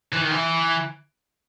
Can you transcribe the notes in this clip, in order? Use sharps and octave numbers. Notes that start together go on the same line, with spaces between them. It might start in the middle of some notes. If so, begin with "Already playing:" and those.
E3
D#3
E3